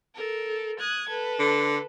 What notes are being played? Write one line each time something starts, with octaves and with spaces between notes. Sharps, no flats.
A4 A#4
D#6 F#6 G#6
A4 B4
D3